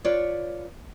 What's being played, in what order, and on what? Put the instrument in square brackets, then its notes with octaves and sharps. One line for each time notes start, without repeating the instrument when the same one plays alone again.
[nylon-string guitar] F4 B4 C#5 D5